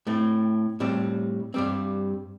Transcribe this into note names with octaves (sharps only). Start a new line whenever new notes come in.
A2 A3 C4
A2 G3 C4
G2 G3 C4